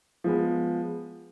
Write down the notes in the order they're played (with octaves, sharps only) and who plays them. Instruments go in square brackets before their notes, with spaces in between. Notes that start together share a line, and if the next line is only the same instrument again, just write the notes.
[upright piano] F3 G#3 B3